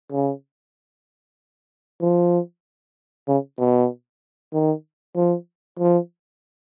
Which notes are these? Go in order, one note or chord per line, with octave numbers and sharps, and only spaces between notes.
C#3
F3
C#3
B2
D#3
F3
F3